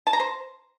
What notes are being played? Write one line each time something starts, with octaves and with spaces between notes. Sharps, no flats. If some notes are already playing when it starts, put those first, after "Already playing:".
A5
A#5
C5